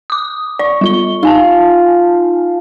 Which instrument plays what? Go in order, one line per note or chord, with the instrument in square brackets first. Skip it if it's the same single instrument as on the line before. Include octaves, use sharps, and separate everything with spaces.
[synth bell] D6 D#6
[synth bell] D5 [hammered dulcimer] C#6
[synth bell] G3 F4 G7
[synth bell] D#4 G#5 A5 [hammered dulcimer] F4